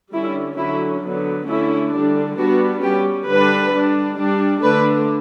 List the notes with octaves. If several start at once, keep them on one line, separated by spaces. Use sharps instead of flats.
D3 G3 C#4 E4
D3 F#3 C#4 E4
D3 F#3 B3
D3 A3 C#4 E4
D3 G3 D4
G3 B3 D4 F#4
G3 C#4 G4
D3 G3 D4 B4
G3 D4
G3 D4
D3 A3 D4 B4